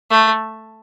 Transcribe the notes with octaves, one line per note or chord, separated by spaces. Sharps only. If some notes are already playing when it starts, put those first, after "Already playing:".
A3